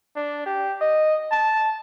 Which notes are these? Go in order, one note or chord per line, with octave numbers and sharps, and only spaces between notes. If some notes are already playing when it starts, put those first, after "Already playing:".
D4
G4
D#5
A5